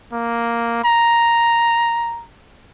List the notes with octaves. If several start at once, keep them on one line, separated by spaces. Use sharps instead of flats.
A#3
A#5